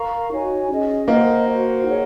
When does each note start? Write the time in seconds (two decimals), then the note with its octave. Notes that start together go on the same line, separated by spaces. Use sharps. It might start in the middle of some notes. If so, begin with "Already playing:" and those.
Already playing: A#4 F5 A#5 C#6
0.31 D#4 F#4 C#5 G#5
0.69 C#4 G#4 D#5
1.08 A#3 C5 D#5 F#5
1.47 F#4 C5 F#5
1.85 D#4 G#4 C#5 F#5